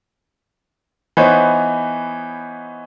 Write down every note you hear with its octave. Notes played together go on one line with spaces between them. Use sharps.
E3 B3 D#4 C5 C#5